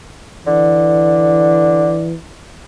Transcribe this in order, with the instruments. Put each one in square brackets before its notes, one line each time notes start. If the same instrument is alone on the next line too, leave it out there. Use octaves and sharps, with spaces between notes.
[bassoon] D3 [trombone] E3